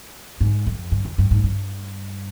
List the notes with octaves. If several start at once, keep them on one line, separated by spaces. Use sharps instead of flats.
G#2
F2
G2
F2
G2
G#2
G2